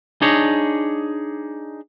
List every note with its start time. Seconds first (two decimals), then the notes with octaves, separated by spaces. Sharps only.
0.22 D4 D#4 G#4 C#5